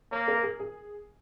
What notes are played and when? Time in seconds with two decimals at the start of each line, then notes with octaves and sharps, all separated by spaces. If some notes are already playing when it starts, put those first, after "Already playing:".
0.12 A#3 C#5
0.28 A#4
0.43 G#4
0.60 G#4